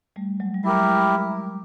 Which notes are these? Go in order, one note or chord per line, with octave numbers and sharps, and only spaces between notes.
G3 A3
F#3 G#3
G3
F#3 G#3 E4 G4 A#4